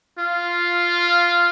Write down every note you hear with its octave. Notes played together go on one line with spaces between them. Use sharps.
F4